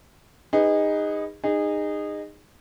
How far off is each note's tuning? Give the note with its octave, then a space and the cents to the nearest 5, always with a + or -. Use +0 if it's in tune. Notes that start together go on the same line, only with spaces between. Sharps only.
D#4 +0 G#4 -30 B4 +0
D#4 -20 G#4 -25